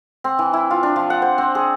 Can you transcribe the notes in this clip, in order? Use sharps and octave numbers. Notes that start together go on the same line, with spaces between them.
C4
E3
E4
F4
D4
F3
F#5
C5
C4
G#4